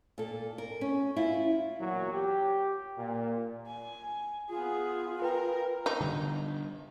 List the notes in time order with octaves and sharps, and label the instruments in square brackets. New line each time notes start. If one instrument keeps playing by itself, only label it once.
[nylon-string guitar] A#2 A4
A#4
C#4
E4 F4
[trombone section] E2 A#2 F#3
G4
A#2
[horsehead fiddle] G#5
[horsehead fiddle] B3 G#4 [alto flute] F4
[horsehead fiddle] A#4 [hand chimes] B4 G5
[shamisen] D#4
[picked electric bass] D3 G3